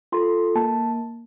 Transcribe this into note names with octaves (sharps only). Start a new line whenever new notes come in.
F4 A4 C6
A#3 A5